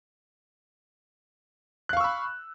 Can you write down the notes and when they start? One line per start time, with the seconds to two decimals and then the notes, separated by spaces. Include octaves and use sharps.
1.89 F#6
1.93 F5
1.97 C#6
2.00 E6
2.04 B5